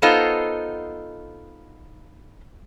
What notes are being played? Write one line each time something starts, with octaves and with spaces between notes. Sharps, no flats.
B3 D#4 F4 A4 C5 D#5